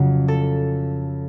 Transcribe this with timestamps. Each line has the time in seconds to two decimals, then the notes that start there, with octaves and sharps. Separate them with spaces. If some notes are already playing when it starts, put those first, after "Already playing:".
Already playing: F2 C#3 F#3 G#4
0.28 A4